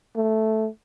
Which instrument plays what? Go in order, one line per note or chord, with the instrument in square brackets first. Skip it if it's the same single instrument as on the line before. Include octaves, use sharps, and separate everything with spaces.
[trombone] A3